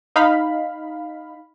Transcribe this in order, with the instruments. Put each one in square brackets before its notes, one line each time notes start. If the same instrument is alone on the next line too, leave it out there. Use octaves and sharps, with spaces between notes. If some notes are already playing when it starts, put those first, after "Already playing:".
[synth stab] D#4 F5 B5